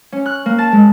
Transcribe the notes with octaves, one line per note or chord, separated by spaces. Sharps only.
C#4
F#6
A#3
A5
G#3